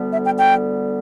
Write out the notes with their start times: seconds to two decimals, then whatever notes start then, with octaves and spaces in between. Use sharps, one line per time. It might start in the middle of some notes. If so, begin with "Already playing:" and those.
Already playing: D2 D3 G3 B3
0.13 E5
0.26 G5
0.40 G5